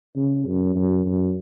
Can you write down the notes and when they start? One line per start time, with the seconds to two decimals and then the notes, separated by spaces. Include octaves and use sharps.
0.16 C#3
0.46 F#2
0.75 F#2
1.06 F#2